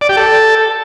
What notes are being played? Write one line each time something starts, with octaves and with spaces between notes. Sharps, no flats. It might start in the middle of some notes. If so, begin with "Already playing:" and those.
D5
G4
A4